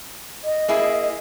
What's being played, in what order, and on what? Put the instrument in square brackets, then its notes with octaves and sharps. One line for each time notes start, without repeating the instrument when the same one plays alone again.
[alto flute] D#5
[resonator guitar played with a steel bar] A#3 E4 G#4